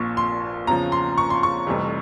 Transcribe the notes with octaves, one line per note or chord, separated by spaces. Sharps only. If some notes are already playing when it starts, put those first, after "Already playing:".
Already playing: A#1 A#2 F3 C#6
C6
E2 C#3 F3 A#5
C6
C#6
C6
C#6
F1 F2 C3 E3 G3